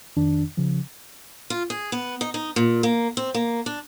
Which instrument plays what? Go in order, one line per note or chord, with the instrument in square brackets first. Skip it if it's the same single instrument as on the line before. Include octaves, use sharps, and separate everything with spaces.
[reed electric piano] F2 D#3 D4
C#3 F3
[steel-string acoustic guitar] F4
G#4
B3
D#4
D#4
A#2
A#3
C4
A#3
D4